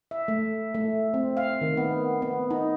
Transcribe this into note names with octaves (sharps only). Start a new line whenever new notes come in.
E5
A3
A3
C4
F5
D#3
B3
B3
D#4